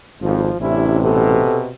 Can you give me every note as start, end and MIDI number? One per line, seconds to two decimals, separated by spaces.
0.22 0.51 32
0.22 0.49 41
0.22 0.57 53
0.60 1.44 33
0.60 1.74 48
0.60 0.98 61
0.60 0.98 62
0.60 0.98 64
1.02 1.70 47
1.02 1.58 69